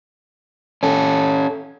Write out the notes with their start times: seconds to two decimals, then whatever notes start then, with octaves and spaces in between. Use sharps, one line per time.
0.83 C#4 A4